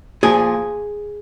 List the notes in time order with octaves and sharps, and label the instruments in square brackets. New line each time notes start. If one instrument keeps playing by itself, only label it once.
[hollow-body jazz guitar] A#2 F3 G#4